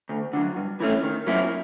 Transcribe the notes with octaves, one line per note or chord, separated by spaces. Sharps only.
D2
D3 F#3
G2
E3 A3 C#4
D#3
F#3 A#3 C#4 E4